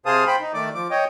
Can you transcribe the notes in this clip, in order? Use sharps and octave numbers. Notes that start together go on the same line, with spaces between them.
C3 G#4 C5 F5 A5 D#6
C5 G5 B5
D#4
D#3 A3 D5 D6
F3 D6
C#5 D#5 G5